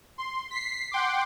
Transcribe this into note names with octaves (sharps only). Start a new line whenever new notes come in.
C6
B6 C7
F#5 G5 C6 D6